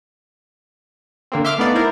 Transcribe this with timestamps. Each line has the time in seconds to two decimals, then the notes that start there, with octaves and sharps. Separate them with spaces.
1.32 D3 A#3 C4
1.44 E5 C6 D6 F6
1.58 A3 B3 D#4 D5 F5
1.75 E4 A#4 C5